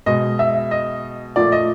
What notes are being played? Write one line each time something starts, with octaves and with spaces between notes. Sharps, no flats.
B2 G#3 D#5
E5
D#5
A#2 F3 A3 D5
D#5